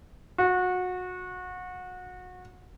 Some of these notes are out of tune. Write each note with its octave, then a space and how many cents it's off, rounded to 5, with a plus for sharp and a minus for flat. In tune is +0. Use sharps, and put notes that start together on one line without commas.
F#4 -25